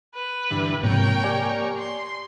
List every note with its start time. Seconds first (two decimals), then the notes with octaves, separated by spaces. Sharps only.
0.15 B4
0.51 G2 D3 E3
0.83 G#2 C3 F3 A#3 C#5 G5
1.24 G4 D5 G#5
1.78 C6